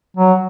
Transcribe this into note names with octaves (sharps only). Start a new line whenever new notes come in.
F#3